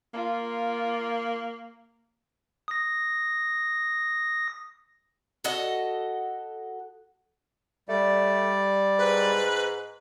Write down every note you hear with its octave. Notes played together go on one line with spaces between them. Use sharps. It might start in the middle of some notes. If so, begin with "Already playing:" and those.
A#3 F4
D#6 A#6
F#4 A4 D#5
G3 A3 D5
G#2 B4